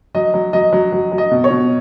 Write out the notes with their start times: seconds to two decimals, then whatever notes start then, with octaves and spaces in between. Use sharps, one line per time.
0.15 F#3 D#5
0.34 F#3
0.53 F#3 D#5
0.73 F#3
0.92 F#3
1.12 F#3
1.18 D#5
1.31 B2
1.44 C#5
1.51 B2